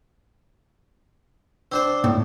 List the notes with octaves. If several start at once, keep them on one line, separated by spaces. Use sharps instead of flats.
C4 D4 C5
A2